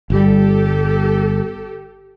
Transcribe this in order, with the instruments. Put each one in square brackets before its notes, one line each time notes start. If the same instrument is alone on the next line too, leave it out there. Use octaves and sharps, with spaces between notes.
[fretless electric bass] G1 G3 [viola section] G4 A4